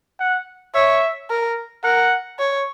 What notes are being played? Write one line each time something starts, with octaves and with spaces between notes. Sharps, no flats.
F#5
C#5 E5
A#4
A#4 F#5
C#5